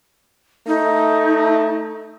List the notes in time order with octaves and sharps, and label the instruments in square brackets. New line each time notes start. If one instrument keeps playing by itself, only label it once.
[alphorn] A3 [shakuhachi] D#4